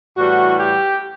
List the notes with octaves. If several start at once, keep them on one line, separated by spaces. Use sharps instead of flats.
A2 E3 G3 F#4
G4